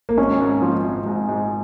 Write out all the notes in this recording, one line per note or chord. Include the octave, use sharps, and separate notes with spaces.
A#3
G#1 C#4
G#2
F3
G#1
G#2
G#2